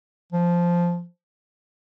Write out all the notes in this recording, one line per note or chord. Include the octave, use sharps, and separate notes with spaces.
F3